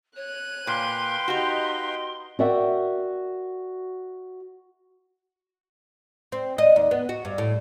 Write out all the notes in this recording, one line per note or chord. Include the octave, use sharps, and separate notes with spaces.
C#5 F#6 D#7
A#2 B4 F5 G5 C6
D#4 F#4 G4 D#5
F#4 A#4 D5 E5 F#5 G5
C4
D#5
D#2
B3
F#4
G2
A2